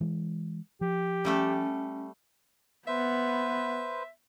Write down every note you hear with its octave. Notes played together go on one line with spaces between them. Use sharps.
E3 G#3
F3 G4
G3 A3 C#4 A4
B3 B4 C5 E5